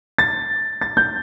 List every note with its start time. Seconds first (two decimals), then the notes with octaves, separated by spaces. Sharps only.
0.18 A6
0.81 A6
0.97 G6